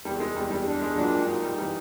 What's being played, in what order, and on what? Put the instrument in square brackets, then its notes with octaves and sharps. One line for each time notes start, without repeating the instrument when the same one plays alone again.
[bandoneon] E2 [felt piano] G3
[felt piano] G#3
[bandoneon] E2 [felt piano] G3
[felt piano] G3
[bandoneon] D4
[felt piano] G#3
[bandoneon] A#2 [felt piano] F#3
[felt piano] F#3 [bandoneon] D#4
[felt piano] G3
[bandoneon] E3 [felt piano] G3